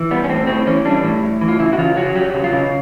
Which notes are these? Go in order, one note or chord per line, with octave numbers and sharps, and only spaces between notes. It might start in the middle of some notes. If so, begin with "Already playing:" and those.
Already playing: E3
G3 B3
C#4
A2 C4
A2 C4
E3 C#4
G3 D4
A2
A2
E3
F4
C#3 E4
F#4
C#3 F4
F#3 F#4
F#3 G4
C#3
F4
C#3